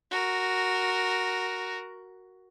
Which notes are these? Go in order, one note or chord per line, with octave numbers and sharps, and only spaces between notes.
F#4 A#4